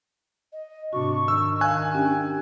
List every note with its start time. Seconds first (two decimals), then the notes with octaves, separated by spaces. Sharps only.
0.52 D#5
0.93 G#2 C3 D4 F#4 C#6
1.28 D#3 E6
1.61 F5 G#5 F#6
1.94 C#4 D4 G4 G5